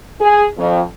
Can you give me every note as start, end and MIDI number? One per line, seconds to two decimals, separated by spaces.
0.20 0.46 68
0.57 0.80 41